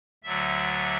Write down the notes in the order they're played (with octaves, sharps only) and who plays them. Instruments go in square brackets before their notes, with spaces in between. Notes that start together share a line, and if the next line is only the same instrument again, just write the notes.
[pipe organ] D2 D3 F#3 E5